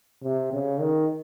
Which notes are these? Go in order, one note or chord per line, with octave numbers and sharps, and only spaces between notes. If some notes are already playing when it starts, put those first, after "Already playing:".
C3
C#3
D#3